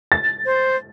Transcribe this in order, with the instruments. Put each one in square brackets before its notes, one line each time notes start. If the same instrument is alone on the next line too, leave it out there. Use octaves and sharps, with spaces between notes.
[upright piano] A6
[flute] C5